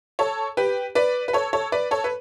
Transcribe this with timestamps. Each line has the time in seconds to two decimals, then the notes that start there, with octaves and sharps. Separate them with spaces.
0.19 A4 C#5
0.57 G4 B4
0.95 B4 D5
1.28 B4
1.33 A4 C#5
1.53 A4 C#5
1.72 B4 D5
1.91 A4 C#5
2.04 B4